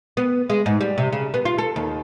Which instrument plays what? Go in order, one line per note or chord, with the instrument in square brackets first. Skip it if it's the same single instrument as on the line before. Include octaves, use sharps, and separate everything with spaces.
[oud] B3
G#3
G#2
G3
C3
C#3
B3
F4
A4
D#2